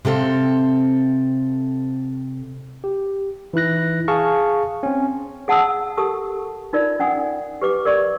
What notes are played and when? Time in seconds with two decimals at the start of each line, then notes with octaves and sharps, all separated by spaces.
0.05 C3 C4 A4 F5
2.84 G4
3.54 E3 D#4 E4 F#6 A#6
4.08 G#4 F5 A5 C#6 F6
4.83 C4 C#4
5.48 G#4 F#5 A5 D#6 E6
5.97 G4 A4 A#4 A5 D#6
6.73 D#4 F4 A#4 D5
7.00 C#4 F#5 G#5 D#6
7.62 G4 B4 D6
7.85 A#4 D5 C#6